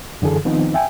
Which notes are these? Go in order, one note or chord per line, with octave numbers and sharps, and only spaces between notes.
F#2 D3 E3 G#4 A4
D#3 F3 B3 C4 D#4
E5 G5 G#5